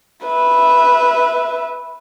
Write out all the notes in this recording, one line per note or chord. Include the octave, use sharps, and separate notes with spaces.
B4 E5